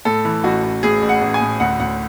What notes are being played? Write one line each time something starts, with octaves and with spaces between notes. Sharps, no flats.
A2 A4
E3
A1 F#4
A1
A2 G#4
A1
F#5
A1
G#5
A2
D2 F#5
D2 F#5